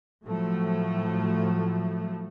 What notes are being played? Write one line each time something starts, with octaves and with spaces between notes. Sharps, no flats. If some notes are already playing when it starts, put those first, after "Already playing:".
A2 F3 F#3 A3